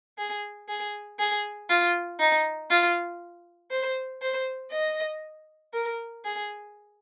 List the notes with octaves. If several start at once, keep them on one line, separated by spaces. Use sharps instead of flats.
G#4
G#4
G#4
F4
D#4
F4
C5
C5
D#5
A#4
G#4